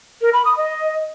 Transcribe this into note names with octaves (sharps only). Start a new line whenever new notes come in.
A#4
B5
D#6
D#5